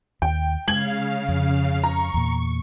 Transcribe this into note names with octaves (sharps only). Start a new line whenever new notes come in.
D#2 G5
C#3 G#3 F5 G#6 F#7
F2
A#5 C#6
E2 A#2